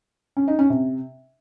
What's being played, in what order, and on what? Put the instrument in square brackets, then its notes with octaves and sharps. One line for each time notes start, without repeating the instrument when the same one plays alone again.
[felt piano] C#4
D#4
C#4
C3